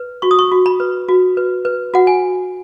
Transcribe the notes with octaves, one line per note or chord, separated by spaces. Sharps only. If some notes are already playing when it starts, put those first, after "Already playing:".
Already playing: B4
F#4 C#6
D#6
C#6
F#4
B5
B4
F#4
B4
B4
F#4 F#5
G#5